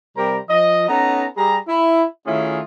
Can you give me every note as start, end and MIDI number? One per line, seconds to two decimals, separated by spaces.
0.17 0.38 48
0.17 0.38 55
0.17 0.38 67
0.17 0.38 70
0.17 0.38 72
0.17 0.38 82
0.49 0.86 53
0.49 0.86 75
0.88 1.26 59
0.88 1.26 61
0.88 1.26 63
0.88 1.26 69
0.88 1.26 82
1.37 1.57 55
1.37 1.57 67
1.37 1.57 68
1.37 1.57 82
1.68 2.03 64
2.27 2.61 51
2.27 2.61 57
2.27 2.61 61
2.27 2.61 64
2.27 2.61 65
2.27 2.61 68